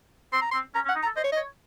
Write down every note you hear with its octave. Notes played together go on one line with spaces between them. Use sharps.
C4 C6
A#5
C6
C4
C#4 A#5
C#4
F#5
D#4
A#5
A4
C5 D#5
C#5
D#5
C#5